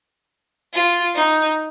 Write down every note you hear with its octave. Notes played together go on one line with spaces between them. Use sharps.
F4
D#4